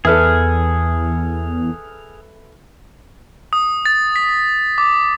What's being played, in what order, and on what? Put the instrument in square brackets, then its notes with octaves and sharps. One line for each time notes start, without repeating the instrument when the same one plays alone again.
[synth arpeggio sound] E2 [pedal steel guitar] G#4 F6 [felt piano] A4 B4 E5
[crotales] D#6
A6
B6
D6